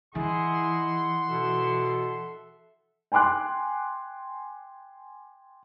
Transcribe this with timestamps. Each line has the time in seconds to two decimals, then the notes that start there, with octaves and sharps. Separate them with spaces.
0.15 E3 E4 G#4 D#5 F#5 C6
1.29 B2 A4 E5
3.12 G5 G#5 C6 D6 F#6